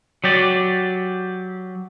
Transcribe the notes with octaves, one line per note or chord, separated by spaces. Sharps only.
F#3 G4 D5